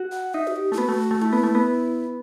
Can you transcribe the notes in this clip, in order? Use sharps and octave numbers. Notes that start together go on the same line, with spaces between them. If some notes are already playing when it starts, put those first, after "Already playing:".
Already playing: F#4
F#5
D#4 E5
F#4
G4
A3 E4
B3 F#4
A3
A3
A3 E4
B3
A3
B3